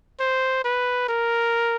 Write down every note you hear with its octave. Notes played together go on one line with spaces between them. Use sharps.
C5
B4
A#4